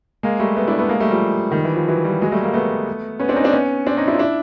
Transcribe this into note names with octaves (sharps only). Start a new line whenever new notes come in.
G#3 A#3
G3 A3
A3 B3
D4 E4
A3 B3
G#3 A#3
G3 A3
F3 G3
D#3
E3
F3
E3 F#3
F3 G3
F#3 G#3
G3 A3
G#3 A#3
A3 B3
B3 C#4
C4 D4
C#4 D#4
C4 D4
B3 C#4
C4 D4
C#4 D#4
D4 E4
F4
D4 E4